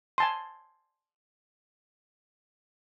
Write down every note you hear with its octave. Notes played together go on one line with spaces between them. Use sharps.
G#5 A5 C6